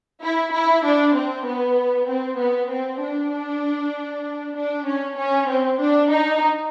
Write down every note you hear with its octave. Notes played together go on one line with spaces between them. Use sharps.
E4
E4
D4
C4
B3
C4
B3
C4
D4
D4
C#4
C#4
C4
D4
D#4